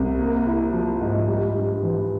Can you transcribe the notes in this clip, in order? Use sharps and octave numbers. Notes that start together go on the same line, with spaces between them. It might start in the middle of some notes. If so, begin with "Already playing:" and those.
Already playing: C2
A#3
E4
F3
G#2
G3
G2
E3